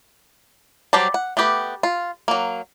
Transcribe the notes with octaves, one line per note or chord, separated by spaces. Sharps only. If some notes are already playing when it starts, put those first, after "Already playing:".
F#3 G3 G4 C5 A5
F#5
A3 B3 G4 B4
F4
F#3 A#3